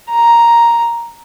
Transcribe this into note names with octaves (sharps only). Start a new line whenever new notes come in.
A#5